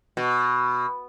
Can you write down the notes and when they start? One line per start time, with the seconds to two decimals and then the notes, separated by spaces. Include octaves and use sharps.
0.17 B2